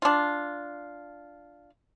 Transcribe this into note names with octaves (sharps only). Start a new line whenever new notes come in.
D4 F4